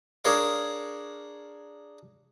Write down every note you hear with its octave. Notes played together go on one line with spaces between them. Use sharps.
D4 G#4 A#4 C#5 F5